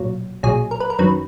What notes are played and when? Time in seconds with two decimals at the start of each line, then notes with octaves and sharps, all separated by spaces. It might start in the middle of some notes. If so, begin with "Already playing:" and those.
Already playing: B1 A#2 F#3
0.43 B1 A#2 F#3 G#4
0.71 A#4
0.80 B4
0.90 A#4
0.99 F#2 D#3 F#3 B4